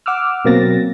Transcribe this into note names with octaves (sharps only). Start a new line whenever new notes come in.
F#5 D6 E6 F6
B2 F#3 A#3 C4 A6 A#6